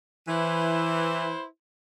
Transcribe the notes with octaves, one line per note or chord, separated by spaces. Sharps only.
E3 E4 B4 C5